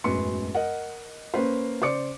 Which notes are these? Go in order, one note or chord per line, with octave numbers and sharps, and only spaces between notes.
E1 A1 F#2 B4 C6 C#7
A#4 D#5 F#5
A#3 C#4 B4 C5
C#3 C5 D5 D6 C#7